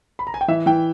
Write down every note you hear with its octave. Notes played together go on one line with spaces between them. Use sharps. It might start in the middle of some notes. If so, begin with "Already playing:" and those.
B5
A#5
G#5
G5
E3 E5
E3 G5